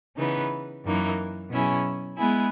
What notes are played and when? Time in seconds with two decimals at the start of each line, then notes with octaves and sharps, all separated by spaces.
0.17 C#3 E3 B3 D#4
0.84 F#2 E3 A#3 D#4
1.51 B2 F#3 C#4 E4 G#4
2.19 G#3 B3 E4 G#4